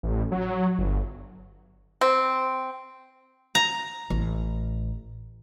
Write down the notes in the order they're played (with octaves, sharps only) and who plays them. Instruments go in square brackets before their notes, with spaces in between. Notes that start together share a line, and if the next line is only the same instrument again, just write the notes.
[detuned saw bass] A1
F#3
G1
[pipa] C4
[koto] A#5
[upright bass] A1